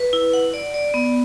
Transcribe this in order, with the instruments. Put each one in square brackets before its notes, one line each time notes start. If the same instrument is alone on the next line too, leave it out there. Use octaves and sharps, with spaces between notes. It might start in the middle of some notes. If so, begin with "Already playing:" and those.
Already playing: [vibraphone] B4
E4
F#5
D5
D5
B3